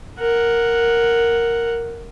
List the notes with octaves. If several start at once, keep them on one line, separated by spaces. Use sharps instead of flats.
A#4 F#5